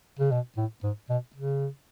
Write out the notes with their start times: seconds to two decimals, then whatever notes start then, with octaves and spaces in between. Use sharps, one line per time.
0.19 C#3
0.32 B2
0.57 A2
0.83 G#2
1.10 B2
1.36 C#3